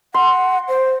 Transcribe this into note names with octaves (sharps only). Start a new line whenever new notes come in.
F#5 C6
C5